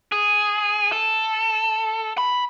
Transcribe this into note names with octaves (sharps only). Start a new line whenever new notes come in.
G#4
A4
B5